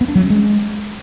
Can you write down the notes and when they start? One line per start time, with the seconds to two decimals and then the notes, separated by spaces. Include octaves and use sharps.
0.01 B3
0.08 D4
0.16 F#3
0.23 C#4
0.30 G#3